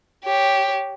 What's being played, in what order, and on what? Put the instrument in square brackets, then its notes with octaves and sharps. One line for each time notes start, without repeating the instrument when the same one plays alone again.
[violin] G4 C#5